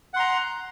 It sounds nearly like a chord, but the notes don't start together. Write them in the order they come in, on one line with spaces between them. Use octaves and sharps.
F#5 C6 A#5